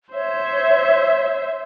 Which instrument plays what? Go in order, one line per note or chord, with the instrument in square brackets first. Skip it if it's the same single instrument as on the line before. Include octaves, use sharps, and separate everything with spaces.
[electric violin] C5 E5 [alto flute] C#5